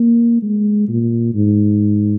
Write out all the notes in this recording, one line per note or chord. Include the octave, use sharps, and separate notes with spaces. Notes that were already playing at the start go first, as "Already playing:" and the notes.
Already playing: A#3
G#3
A#2
G#2